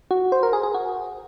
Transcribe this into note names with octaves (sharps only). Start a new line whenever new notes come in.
F#4
C5
A#4
G#4
G#4
F#4